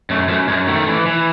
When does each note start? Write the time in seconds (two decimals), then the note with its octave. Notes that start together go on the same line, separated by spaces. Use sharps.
0.10 F#2 A3
0.29 F#2 A3
0.48 F#2 G#3
0.67 D#3 A3
0.88 E3
1.06 E3